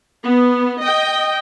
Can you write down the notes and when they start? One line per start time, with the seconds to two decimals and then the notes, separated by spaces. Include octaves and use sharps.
0.23 B3
0.81 D#5 G5